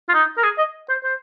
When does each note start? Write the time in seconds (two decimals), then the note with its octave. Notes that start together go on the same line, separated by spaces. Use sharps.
0.09 F4
0.14 D#4
0.38 A#4
0.43 G#4
0.58 D#5
0.89 C5
1.04 C5